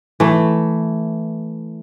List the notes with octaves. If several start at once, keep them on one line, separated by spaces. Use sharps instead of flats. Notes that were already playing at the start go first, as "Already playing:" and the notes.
E3 A3